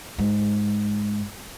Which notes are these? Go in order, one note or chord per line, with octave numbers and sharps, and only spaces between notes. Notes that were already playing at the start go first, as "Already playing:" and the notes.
G#2